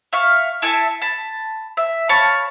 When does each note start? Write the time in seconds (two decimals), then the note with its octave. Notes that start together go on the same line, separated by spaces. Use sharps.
0.13 E5 F5 C#6 F6
0.62 E4 A4 E5 G#5
1.02 A5 B5
1.77 E5
2.09 C#5 F5 A5 B5